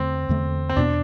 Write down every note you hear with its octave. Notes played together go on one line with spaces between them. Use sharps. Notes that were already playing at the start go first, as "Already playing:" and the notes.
Already playing: E2 D3 A3 C4
E2 D3 A3
C4
E2 B2 B3 D4